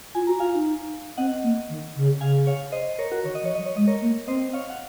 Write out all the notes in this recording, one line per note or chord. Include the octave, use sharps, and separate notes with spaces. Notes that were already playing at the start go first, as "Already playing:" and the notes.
F4 G#5
F#4 A#5
F4 F5 G#5
D#4
C4 D#5 F#5
A#3
D#3
C#3
C#3 F5 G#5
C#5 F5
C5 D#5
A#4 C#5
F#4 A#4
D#3 C#5
D#5
F3
C#5
F#3 D#5
C#5
G#3 D#5
A#4 C#5
A#3
C4 C5 D#5
C#5 F5
F#5